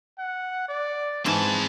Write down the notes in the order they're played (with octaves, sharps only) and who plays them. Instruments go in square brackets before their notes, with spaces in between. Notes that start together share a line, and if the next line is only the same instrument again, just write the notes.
[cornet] F#5
D5
[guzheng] G#2 E3 [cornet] B3 [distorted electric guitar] C4 A5